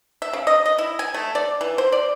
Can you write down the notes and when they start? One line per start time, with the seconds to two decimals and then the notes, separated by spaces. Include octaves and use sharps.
0.22 E5
0.33 C#3
0.47 D#5
0.66 D#5
0.78 E4
0.99 G#5
1.14 A3
1.35 D5
1.61 E3
1.78 C5
1.92 D5